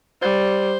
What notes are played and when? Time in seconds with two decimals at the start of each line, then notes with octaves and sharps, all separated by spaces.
0.22 G3 C5